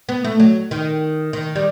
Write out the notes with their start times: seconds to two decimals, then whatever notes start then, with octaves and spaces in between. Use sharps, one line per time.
0.09 B3
0.24 A3
0.40 F#3
0.71 D#3
1.33 D#3
1.56 G3